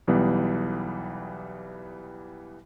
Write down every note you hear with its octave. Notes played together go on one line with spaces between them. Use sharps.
B1 E3 G3 B3